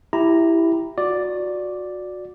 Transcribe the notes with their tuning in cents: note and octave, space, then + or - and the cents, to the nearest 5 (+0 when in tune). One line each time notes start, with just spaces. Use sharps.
E4 +5 G4 +0 A#5 +0
F#4 -25 D5 +0